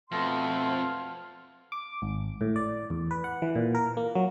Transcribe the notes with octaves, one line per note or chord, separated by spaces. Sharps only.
F2 B2 A3 F5 A5 C6
D6
G#1
A2
D5
E2
B4
F#5
E3
A#2
A#4
A#3
F#3